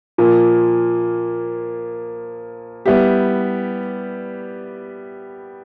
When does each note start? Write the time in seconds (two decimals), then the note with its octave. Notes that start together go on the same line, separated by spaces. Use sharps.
0.18 A#2 F3 A#3
2.86 G3 B3 E4 G4